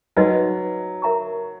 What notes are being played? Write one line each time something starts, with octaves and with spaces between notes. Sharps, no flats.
F#3 D#4 F#4 B4 D#5 G#5
A#4 E5 A#5 C#6